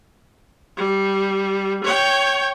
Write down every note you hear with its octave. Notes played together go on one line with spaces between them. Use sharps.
G3
C#5 G5